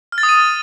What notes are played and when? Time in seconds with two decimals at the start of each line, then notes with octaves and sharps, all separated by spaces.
0.12 F6
0.18 A6
0.23 D#6
0.29 D#7